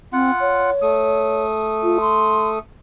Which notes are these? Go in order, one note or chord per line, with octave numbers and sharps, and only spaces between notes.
C4 F4 F#5
C#5
A3 D#6
F4
C6